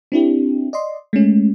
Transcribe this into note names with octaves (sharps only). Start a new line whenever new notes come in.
C4 D4 E4 G4
D5 D#5 C6
G#3 A3 C#4